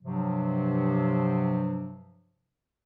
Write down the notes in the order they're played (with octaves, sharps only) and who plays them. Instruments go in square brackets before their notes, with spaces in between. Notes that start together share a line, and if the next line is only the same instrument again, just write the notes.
[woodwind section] G2 C3 F3 F#3